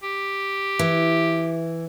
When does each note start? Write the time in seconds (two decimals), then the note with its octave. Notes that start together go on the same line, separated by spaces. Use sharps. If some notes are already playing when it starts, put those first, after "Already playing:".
0.03 G4
0.79 E3